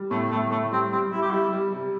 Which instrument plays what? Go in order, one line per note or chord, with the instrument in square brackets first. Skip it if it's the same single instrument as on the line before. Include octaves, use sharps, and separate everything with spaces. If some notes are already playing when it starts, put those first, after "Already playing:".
Already playing: [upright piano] G3
[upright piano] A2 [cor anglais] A3
[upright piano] A2 [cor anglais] A3
[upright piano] A2 [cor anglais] A3
[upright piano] G3 [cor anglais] C4
[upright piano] G3 [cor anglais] C4
[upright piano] G3 [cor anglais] E4
[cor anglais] G4
[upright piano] G3 [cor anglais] E4
[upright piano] G3
C3